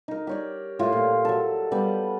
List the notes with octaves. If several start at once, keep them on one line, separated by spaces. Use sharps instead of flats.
D#4 A#4
G4 C#5 D5
A2 F4
A#2
F#3 A4
G3 B3 B4